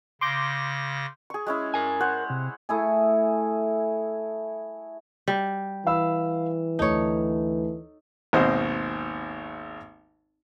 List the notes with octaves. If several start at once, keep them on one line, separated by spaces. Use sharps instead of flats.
C#3 C6 D6 G6 A#6
G#4 C#6
G#3 C#4 E4
A#4 G#5
C5 C#5 F#5
C3
A3 E4 G#4
G3
E3 F5 B5 E6
D2 D#4 C#5 A5
G#1 D#2 B2 C4 C5 D#5